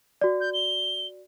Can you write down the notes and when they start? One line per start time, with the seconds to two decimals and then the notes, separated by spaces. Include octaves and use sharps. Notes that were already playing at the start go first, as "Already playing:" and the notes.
0.21 F#4 D5
0.40 G6
0.53 G7